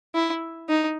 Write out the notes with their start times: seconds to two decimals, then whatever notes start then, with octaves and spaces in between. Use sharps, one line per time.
0.15 E4
0.69 D#4